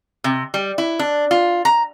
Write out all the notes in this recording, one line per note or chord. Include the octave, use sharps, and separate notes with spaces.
C3
G3
E4
D4
F4
A#5